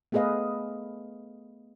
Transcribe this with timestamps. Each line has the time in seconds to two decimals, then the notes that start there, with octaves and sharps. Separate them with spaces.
0.12 A3 B3 G#4 B4 D#5 F5